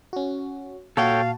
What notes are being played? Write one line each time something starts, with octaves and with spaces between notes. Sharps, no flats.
C#4 F#4
A#2 F#4 A4 C#5 F5 G5 A5